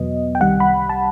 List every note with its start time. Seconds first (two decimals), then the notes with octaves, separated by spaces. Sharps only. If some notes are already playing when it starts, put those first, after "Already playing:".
Already playing: E2 B2 F#3 B3 D#5
0.35 G5
0.40 C2 C3 D#3 G3 F#5
0.60 B5
0.89 A5